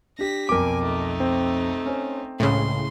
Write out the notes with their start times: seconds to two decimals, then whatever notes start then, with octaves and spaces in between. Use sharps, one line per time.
0.19 D4 G4 A#6 B6
0.49 B1 F2 A#4 G#5 D6
0.83 A3 D#4
1.20 C4
1.86 C#4 C5
2.40 C#2 A2 C#3 C6